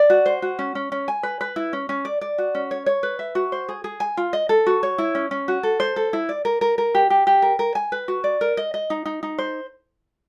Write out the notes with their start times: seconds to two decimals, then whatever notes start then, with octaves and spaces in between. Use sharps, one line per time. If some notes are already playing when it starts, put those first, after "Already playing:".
Already playing: D5
0.10 F#4
0.26 C5
0.42 F#4
0.59 C#4
0.75 C#4
0.92 C#4
1.08 G#5
1.23 B4
1.41 B4
1.56 E4
1.73 C#4
1.89 C#4
2.05 D5
2.21 D5
2.38 F#4
2.55 C#4
2.71 C#5
2.86 C#5
3.03 B4
3.19 E5
3.35 F#4
3.52 C5
3.69 G#4
3.84 G#4
4.00 G#5
4.17 F4
4.33 D#5
4.49 A4
4.66 F#4
4.83 C#5
4.98 E4
5.15 C#4
5.31 C#4
5.48 F#4
5.63 A4
5.80 C5
5.96 A4
6.13 E4
6.29 D5
6.45 A#4
6.61 A#4
6.78 A#4
6.95 G4
7.10 G4
7.27 G4
7.42 A#4
7.59 A#4
7.75 G#5
7.92 B4
8.08 F#4
8.24 D5
8.41 A#4
8.57 D#5
8.74 D#5
8.90 D#4
9.05 D#4
9.23 D#4
9.38 C5